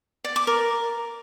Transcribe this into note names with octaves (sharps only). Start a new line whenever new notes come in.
D5
D6
A#4